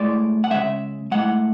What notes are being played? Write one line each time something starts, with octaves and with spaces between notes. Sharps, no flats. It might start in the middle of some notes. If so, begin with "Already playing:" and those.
Already playing: A2 G#3 D5
F#5
C#3 G#3 E5
A2 G#3 F#5